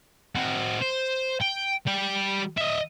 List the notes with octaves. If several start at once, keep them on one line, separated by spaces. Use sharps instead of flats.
C4 F#4
C5
G5
G3 G5
D#5 E5